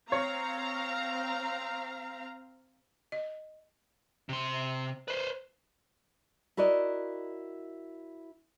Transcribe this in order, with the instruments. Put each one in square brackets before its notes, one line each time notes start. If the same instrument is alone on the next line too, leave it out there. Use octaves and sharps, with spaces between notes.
[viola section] C4 F5 A#5 [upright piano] C#5
[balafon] D#5
[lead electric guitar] C3 C6
B4 C5
[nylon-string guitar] E4 F#4 A#4 D5 D#5